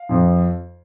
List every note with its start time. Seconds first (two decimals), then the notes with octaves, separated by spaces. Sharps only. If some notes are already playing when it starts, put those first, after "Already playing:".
Already playing: F5
0.09 F2 F3